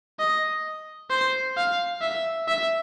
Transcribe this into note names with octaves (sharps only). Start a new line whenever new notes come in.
D#5
C5
F5
E5
E5